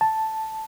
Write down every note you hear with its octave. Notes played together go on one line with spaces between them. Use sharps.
A5